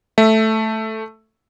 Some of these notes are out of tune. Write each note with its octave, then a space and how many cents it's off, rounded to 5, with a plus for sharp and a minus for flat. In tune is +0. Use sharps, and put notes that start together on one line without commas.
A3 +0 E5 +0